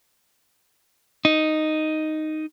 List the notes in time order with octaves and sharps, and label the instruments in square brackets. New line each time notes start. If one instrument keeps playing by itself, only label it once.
[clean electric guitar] D#4